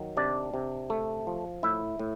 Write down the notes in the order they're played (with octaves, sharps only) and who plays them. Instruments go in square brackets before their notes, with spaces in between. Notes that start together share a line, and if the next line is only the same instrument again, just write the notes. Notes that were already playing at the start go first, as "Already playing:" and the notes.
Already playing: [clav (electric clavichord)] D#3 F#3
C3 D4 D5
C3
A3
F3
A2 E4 E5
A2